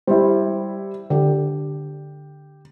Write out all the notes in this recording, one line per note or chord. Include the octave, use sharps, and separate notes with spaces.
G3 E4 C5
D3 G4